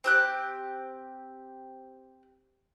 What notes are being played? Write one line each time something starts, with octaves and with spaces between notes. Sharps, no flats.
C4 G4 F#6